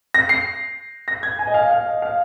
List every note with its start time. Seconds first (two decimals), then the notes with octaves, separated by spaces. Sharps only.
0.14 A#6
0.29 C7
1.08 A#6
1.23 G#6
1.39 G#5
1.47 D#5
1.54 F5
1.71 F5
1.86 D#5
2.02 F5